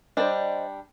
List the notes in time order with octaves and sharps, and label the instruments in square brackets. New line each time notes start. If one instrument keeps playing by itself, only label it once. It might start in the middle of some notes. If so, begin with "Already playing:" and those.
[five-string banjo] G3 D4 [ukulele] C5 D5 D#5